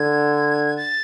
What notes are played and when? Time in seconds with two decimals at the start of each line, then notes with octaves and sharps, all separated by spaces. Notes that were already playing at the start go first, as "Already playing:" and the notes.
Already playing: D3 G#6
0.77 A6